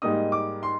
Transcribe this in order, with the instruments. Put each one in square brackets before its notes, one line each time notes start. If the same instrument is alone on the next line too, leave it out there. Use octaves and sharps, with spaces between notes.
[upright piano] G#2 G3 A#3 D#4 D#6
D6
C6